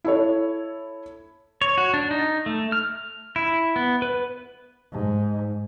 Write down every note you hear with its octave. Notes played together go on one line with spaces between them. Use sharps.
E4 A4 C#5
C#5
F#4
D4
D#4
A3
F6
E4
B3
B4
G#2